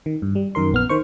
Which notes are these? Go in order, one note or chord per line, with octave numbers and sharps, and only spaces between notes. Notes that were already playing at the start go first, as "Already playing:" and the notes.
D#3
G2
G3
F#2 D#3 A#4 C6
A#1 B3 F6
D#3 C5 C#6